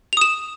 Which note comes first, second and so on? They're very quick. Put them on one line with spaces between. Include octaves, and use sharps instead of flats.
F7 D#6 E7